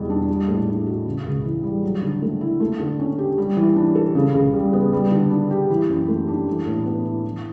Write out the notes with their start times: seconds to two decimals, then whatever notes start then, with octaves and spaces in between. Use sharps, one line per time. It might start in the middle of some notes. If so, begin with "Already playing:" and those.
Already playing: E2 B2 G3
0.10 D4
0.29 G3
0.48 A2
0.67 D4
0.87 F#4
1.06 C#3
1.25 C#2
1.45 E3
1.63 G3
1.83 F#3
2.02 D3
2.22 A3
2.41 E4
2.60 A3
2.80 D3
3.00 C#4
3.18 G4
3.38 G3
3.57 E3
3.76 D4
3.95 A4
4.15 C#3
4.34 C#2
4.54 G3
4.73 B3
4.92 G3
5.11 D3
5.31 D4
5.51 G4
5.70 E3
5.89 F#2
6.08 A3
6.28 D4
6.47 E3
6.66 A2
6.86 B3
7.05 E4
7.25 E3